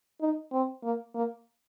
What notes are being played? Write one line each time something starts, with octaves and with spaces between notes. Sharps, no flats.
D#4
C4
A#3
A#3